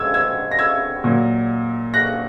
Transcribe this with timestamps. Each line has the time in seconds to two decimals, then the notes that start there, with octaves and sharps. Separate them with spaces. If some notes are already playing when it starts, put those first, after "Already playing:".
Already playing: G#2 E6 G#6
0.14 E6 G#6
0.51 A#6
0.59 E6 G#6
1.04 A#2 F#3
1.94 F#6 A#6